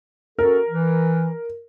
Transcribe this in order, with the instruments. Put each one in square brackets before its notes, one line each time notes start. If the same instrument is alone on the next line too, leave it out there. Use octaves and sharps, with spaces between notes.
[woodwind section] C#4 F#4 A4 [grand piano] A#4
[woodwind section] E3